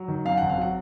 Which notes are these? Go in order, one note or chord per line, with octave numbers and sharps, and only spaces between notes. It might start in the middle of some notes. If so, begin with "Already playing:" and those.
Already playing: F#3
D#3
F#2 F5
G#1 F#5
F5
F#3 F#5